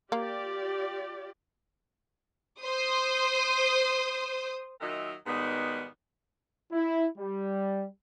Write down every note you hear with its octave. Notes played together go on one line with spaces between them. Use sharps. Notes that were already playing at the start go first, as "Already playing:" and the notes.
A#3 F4 G4 D5
C5 D#6
A#2 D#3 F#3 A#4 D#5 E5
G#2 B2 D#3 G3 B3
E4
G3